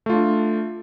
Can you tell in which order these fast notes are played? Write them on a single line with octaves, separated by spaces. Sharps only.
A3 F4 D4